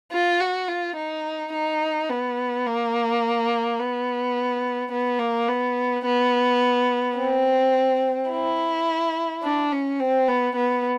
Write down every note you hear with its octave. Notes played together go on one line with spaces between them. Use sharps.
F4
F#4
F4
D#4
D#4
B3
A#3
B3
B3
A#3
B3
B3
C4
E4
D4
C#4
C4
B3
B3